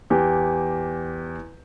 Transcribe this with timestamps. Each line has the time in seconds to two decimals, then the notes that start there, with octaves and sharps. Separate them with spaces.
0.10 E2 G4